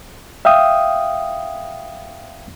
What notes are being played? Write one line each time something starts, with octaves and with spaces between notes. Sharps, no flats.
E5 F5 G5 D#6